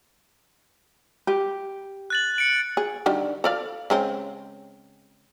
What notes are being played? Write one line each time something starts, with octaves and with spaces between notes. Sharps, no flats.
G4
F#6 A6 F#7
C#7 D7
G#4
D3 D#3 G3
A4 D5 F5
C#3 G#3 C4